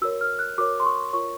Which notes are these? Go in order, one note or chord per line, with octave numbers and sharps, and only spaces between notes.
F#4 A#4 C#5 E6
F6
F#6
F#4 A#4 C#5 D6
C6
C#6
F4 A#4 C#5 C#6